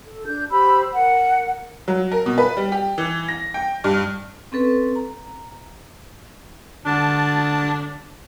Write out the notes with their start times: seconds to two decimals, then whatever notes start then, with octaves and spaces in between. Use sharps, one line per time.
0.07 A4
0.26 D4 G6
0.50 G4 C5 B5 E6
0.93 A#4 F#5
1.88 F#3
2.12 A#4
2.26 B2
2.38 B4
2.57 G3
2.72 G4
2.98 E3
3.28 A#6
3.54 G5
3.84 G2
4.52 C4 C#4 A4 B4
4.96 A#5
6.86 D3 D4 A5